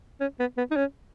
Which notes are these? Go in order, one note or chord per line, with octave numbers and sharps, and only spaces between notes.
C#4
B3
B3
D#4
C#4